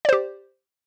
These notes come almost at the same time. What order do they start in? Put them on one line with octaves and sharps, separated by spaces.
D5 C5 G4